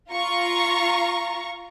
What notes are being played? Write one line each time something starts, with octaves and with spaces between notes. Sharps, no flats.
F4 A#5 C#6